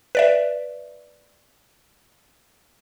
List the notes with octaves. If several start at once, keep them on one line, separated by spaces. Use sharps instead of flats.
B4 D5 E5